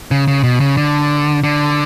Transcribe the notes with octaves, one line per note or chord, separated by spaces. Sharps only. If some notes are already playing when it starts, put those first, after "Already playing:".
C#3
C#3
B2
C#3
D3
D3